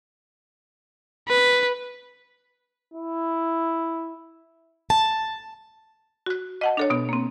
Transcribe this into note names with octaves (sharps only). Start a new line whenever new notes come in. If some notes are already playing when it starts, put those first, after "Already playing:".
B4
E4
A5
F#4 F#6
D#5 F#5 A5
D4 A4 C#5
B2 B3
A#3 C4